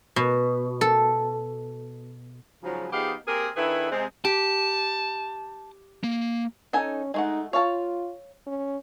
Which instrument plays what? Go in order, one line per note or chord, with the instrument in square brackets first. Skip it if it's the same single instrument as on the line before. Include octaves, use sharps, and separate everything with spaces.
[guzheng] B2
A4
[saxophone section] G#2 C#3 F3 F#3
F3 B3 D#4 G4 G#4 F5
A#3 C4 G4 G#4 A#4
D#3 D4 E4 G#4 A4 B4
C3 G#3 C4
[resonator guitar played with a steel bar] G4 [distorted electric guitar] A5
[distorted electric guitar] A#3
[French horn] C#4 [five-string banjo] D#4 A4 G#5
[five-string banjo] G#3 A3 F#5 [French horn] D#4
[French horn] F4 [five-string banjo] C#5 F5 A5
[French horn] C#4